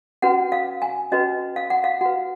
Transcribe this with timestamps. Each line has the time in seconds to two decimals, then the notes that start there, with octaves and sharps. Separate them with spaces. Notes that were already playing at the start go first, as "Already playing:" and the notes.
0.22 C#4 F#4 B4 F#5
0.52 F5
0.82 G#5
1.12 C#4 F#4 B4 D#5
1.56 F5
1.70 F#5
1.84 F5
2.01 F#4 B4 F#5